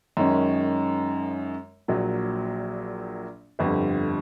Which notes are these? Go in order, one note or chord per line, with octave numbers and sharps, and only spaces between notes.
F#2 D#3 G#3 C#4
A#1 A#2 F#3
G1 F2 D3 G3